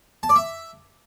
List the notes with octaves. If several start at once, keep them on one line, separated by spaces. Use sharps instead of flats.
A5
D5
E5